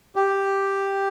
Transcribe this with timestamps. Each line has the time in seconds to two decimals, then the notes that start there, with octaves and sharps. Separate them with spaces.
0.16 G4